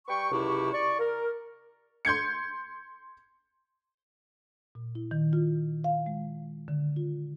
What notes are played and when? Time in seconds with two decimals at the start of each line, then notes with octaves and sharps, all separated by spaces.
0.08 G3 B4 G5 C#6
0.31 C#2 F#2 C3 E4 G4 C#6
0.73 D5 C#6
0.99 A#4
2.05 C6 G6 G#6 C#7
4.75 A#2
4.95 E4
5.11 D#3
5.33 F4
5.84 F5
6.06 G#3
6.68 D3
6.96 F4